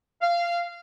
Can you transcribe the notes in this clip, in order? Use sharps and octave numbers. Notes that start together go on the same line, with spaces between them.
F5